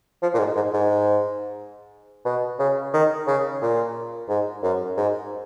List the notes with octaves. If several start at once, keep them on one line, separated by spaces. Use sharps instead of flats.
F3
A#2
G#2
G#2
G#2
B2
C#3
D#3
C#3
A#2
G#2
F#2
G#2